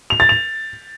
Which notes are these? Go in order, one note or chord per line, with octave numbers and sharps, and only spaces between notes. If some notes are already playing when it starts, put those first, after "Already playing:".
F7
A6
F7